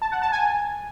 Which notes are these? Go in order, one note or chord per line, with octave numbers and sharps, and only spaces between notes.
A5
F#5
A5
G#5